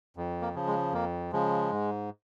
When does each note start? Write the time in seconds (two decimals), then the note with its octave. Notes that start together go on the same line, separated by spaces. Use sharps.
0.17 F2
0.41 A#3
0.55 C#3 F3
0.67 G#3
0.93 F2 A#3
1.32 C#3 F3 G#3
1.71 G#2